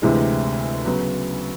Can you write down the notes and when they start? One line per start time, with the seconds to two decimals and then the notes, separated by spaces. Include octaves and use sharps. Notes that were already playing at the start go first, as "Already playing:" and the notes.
0.02 D2 C3 E3 G#3
0.85 C#3 F#3 B3